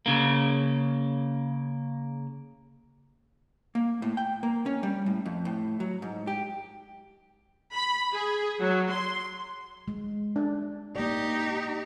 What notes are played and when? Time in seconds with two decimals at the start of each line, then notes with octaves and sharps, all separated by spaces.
0.06 C#3 A#3
3.75 A#3
4.02 A2
4.17 G5
4.43 A#3
4.66 C#4
4.83 G3
5.06 A2
5.26 F2
5.45 A2
5.80 F#3
6.02 G#2
6.27 G4
7.75 B5
8.13 G#4
8.60 F#3
8.91 C6
9.88 G#3
10.36 D4
10.96 A#3 D#4 G4 D5